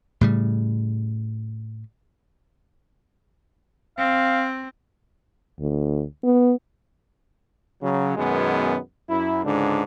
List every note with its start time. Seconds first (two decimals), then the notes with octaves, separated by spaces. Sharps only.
0.21 A2 C#3 G3
3.98 C4 F5
5.60 D2
6.23 B3
7.82 C#3 F#3
8.17 F#2 B2 D#3 G#3 B3
9.09 F#2 E4
9.44 C#2 G#2 D3 D4